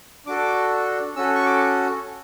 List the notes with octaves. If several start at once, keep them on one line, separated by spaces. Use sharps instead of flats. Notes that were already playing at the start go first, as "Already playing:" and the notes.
D4 F#4 A4 D6
C#4 F#4 A4 E6
C#6
D6